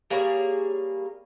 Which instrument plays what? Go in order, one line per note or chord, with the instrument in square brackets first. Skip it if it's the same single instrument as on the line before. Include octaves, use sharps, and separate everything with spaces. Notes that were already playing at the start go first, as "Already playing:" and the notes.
[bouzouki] G3 A#3 G#4 C#5